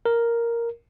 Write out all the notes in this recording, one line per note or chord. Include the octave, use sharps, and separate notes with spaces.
A#4